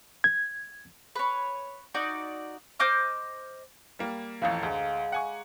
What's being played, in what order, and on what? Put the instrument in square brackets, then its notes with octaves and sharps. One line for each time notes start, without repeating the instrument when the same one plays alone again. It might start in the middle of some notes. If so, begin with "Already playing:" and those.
[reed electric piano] G#6
[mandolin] B4 C#5
D#4 F#4 D5
C5 D#5 D6 F6
[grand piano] G3 A#3
[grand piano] A1 F2 A2 [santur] F5 A#5
[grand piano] D2 [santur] G#3 D6
[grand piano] F#5 G#5 C#6